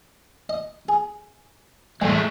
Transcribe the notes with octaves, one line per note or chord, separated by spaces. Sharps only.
D#5
G#4
B1 E2 A2 G#3 A3